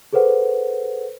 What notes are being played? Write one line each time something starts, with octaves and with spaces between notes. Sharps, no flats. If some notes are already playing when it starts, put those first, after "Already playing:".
G#4 A4 B4 C5 F#5